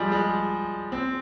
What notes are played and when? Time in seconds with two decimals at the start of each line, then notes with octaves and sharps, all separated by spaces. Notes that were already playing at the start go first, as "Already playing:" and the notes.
Already playing: F3 G3 G#3
0.12 G#3
0.92 C4